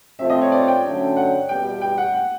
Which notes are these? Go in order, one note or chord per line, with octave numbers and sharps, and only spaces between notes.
F3 A3 C4 E5
D#5
C#5
D5
G5
D3 F#3 A3 C#4
F#5
E2 B2 G3 B3 G5
G5
F#5
F#5